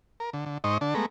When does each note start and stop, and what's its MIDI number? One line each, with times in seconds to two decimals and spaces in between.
0.20 0.30 70
0.33 0.46 50
0.46 0.58 50
0.64 0.78 44
0.64 0.78 63
0.64 0.78 72
0.64 0.78 75
0.64 0.78 85
0.81 0.94 50
0.81 0.94 62
0.81 0.94 81
0.94 1.06 56
0.94 1.06 57
0.94 1.06 59
0.94 1.06 82